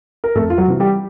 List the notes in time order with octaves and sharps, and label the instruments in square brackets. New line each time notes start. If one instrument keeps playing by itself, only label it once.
[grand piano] A#4
F2 A3 A4
F4
F#3 F#4
C3 E3 G3
G3 G4